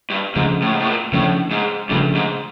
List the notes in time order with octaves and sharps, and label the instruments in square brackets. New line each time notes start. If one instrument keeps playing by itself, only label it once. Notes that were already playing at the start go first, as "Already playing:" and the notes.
[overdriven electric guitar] G2
[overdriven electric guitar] G#2 [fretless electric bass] C#3 F3 A3 D4
[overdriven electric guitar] A2
G#2
A2
A#2
[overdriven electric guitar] A2 [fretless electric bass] C#3 F3 A3 D4
[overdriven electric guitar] G#2
[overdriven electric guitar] G2 [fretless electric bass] C#3 F3 A3 D4
[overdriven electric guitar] G#2